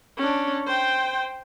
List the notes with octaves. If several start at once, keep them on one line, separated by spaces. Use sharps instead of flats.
C#4 D4
C5 G5